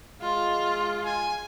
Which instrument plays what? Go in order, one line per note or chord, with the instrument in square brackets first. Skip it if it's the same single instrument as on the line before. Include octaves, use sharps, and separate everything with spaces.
[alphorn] G#3 [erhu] F4
[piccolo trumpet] G#5